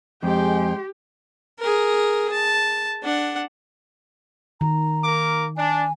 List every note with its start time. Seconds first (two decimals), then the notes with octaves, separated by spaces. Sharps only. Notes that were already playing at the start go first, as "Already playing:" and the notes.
0.23 F2 G#3 G4 G5 C6
1.59 G#4 A#4
2.32 A5
3.03 D4 F#5
4.61 D#3 A#5
5.03 A#3 A#4 D6
5.57 D4 G#5